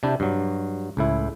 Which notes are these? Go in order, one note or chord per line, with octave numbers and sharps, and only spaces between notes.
C3 D4 E4 G4
G2 F#3
C#2 A2 E4